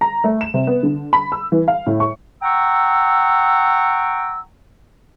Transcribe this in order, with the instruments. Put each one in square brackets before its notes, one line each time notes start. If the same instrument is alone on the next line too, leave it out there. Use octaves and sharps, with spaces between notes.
[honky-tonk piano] A#5
A3
E7
C3
B3
D3
B5
E6
E3
F5
A2
C#6
[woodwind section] F#5 G5 A#5 C#6 E6